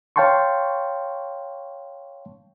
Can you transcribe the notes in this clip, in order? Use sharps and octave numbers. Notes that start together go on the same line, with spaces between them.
C#5 F5 G5 A5 C6 C#6